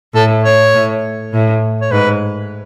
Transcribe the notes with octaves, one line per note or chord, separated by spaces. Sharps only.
A2 A4
C#5
A2
A2
C#5
G#2 B4